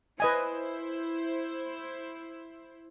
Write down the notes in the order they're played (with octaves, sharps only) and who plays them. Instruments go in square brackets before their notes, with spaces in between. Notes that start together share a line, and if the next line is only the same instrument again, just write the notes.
[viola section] E4 C5 [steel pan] B4 D#5 G#5